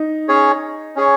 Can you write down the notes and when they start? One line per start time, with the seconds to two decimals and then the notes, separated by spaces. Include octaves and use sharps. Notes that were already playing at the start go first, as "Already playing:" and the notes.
Already playing: D#4
0.29 C#4 G#4 C#5
0.96 C#4 G#4 C#5